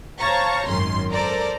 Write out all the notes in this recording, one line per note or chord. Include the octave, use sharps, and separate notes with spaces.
C5 C#5 F5 A5 A#5 C#6
G#1 F#2 D#3 C#4 C6
A4 A#4 C5 D5 A#5